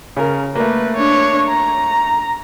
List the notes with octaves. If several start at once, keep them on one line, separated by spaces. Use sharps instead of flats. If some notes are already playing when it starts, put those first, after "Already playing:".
C#3 A#4
A3 A#3 B4
D4 C#5
A#5